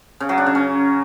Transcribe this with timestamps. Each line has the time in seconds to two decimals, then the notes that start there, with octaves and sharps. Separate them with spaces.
0.20 C#3
0.29 F#3
0.38 D4
0.46 C#3
0.55 C#4